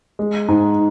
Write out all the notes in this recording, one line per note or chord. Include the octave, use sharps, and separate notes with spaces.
G#3
G#2